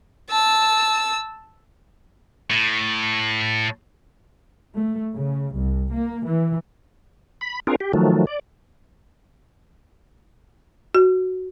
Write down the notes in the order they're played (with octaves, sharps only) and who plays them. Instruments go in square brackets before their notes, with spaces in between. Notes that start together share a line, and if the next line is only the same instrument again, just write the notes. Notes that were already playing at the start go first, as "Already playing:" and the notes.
[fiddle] A5 E6
[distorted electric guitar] A2
[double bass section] A3
C#3
C2
A#3
E3
[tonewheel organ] B5
C4 D4 F4 G#4 A#4
G4
D#3 F3 F#3 A3
D5
[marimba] F#4